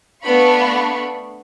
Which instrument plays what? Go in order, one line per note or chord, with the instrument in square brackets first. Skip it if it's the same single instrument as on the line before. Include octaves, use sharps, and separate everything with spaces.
[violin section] A3 B3 D4 F5 B5 C#6